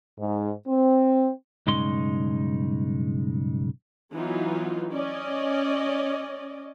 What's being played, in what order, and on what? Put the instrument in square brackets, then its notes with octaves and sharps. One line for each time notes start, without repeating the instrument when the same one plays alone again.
[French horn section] G#2
C4
[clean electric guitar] B1 G2 C#3 G#3 D#4 C6
[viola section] E3 F#3 B3 D#4 F4
C#4 D5 D#5